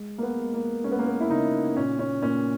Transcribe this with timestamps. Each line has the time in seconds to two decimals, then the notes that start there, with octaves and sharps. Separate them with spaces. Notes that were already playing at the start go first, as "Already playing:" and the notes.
Already playing: G#3
0.18 A#3
0.22 B3
0.38 G#3
0.54 A#3
0.84 G#3 C#4
0.92 B3
0.99 A#3
1.06 B3
1.20 E4
1.30 C#3 D#4
1.77 A#2 C#4
1.99 C#4
2.22 A#2 C#4